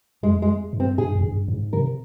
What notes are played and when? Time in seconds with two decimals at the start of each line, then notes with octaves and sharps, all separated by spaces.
0.23 F2 G#3
0.42 G#3
0.73 G2
0.80 C4
0.98 G2 G#4
1.15 F2
1.23 G2
1.48 G#2
1.73 C3 A#4